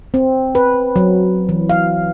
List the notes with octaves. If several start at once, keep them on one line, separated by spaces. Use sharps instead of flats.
C4
B4
F#3
E3
F5